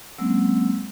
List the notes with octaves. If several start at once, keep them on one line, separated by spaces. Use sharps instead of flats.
F#3 G#3 A#3 C4 C#4 E6